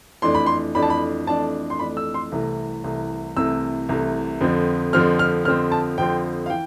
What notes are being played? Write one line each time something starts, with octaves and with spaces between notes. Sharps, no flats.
F2 E3 A3 D4 C6
B5
C6
F2 E3 A3 D4 B5
A5
B5
F2 E3 A3 D4 A5
C6
F2 E3 A3 D4 B5
E6
C6
C2 C3 E3 A3
C2 C3 E3 A3
C2 C3 E3 A3 E6
C2 C3 E3 A3
F2 D3 F3 C4
F2 D3 F3 C4 F6
F6
F2 D3 F3 C4 F6
A5
F2 D3 F3 C4 G5
F5
E3 G5